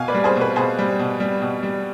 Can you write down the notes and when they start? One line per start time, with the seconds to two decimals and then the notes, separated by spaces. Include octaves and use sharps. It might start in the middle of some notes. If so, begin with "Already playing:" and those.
Already playing: B2 F5 G#5
0.08 B4 D5
0.14 G3
0.24 G#4 C5
0.36 B2
0.41 B4
0.56 B2 G#4 C5
0.79 G3
0.99 B2
1.20 G3
1.42 B2
1.63 G3